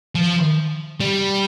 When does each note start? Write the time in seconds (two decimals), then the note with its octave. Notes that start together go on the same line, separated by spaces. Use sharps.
0.15 F3
1.00 G3